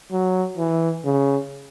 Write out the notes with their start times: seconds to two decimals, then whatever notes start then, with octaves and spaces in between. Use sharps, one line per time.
0.12 F#3
0.58 E3
1.05 C#3